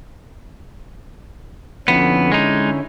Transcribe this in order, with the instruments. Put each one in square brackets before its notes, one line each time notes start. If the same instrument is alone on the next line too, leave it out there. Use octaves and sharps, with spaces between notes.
[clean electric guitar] F2 B3 [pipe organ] D3 C#4 E4
[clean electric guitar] G#3 D#4